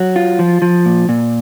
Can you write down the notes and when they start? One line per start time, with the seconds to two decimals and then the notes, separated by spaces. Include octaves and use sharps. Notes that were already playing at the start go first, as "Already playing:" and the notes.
Already playing: F#3
0.16 F4
0.39 F3
0.62 F3
0.86 A#2
1.09 A#2